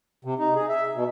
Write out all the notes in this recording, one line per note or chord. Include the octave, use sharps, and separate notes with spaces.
C3
D#4
G#4
E5
B2